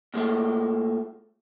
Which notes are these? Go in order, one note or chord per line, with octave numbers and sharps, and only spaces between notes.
A#2 G#3 A3